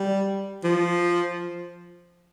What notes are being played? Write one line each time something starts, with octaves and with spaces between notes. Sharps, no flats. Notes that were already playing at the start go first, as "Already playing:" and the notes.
Already playing: G3
F3